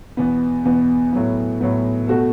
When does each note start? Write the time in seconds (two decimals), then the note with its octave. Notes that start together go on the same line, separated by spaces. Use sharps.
0.17 E2 B2 B3
0.65 E2 B2 B3
1.13 A2 F#3 B3
1.60 A2 F#3 B3
2.08 B2 A3 F#4 A4